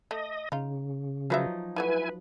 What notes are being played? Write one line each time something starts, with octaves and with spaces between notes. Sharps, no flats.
A3 D#5
C#3 D#4 F4
F3 F#3 D#4 F4 B4 E5
G3 A3 E4 F#4 B4 G#5